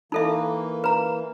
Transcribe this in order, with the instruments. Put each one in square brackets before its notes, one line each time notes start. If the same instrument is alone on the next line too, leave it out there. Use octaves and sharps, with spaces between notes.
[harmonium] E3 A#3 [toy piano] D#4 A4 E5
[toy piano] B4 A#5